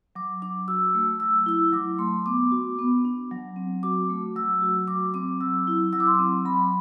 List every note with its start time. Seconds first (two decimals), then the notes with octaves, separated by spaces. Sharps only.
0.15 F#3 D6
0.42 D4 D6
0.68 F#4 E6
0.94 A3
1.20 F#3 E6
1.46 E4 E6
1.72 F#3 D6
1.99 A3 C6
2.26 B3 D6
2.52 F#4
2.79 B3
3.05 D4
3.31 F#3
3.56 C4
3.83 F#4 D6
4.09 A3
4.36 F#3 E6
4.62 F#4
4.88 F#3 D6
5.14 C4 D6
5.40 F#3 E6
5.67 E4
5.93 F#3 E6
6.00 D6
6.07 C6
6.15 C4 D6
6.45 F#3 B5